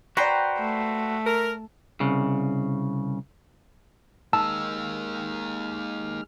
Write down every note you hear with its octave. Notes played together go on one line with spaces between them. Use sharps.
F#4 B4 C5 D5 G5 A#5
A3
A#4
C2 C#3
G#3 A#3 D#4 A5 E6 F6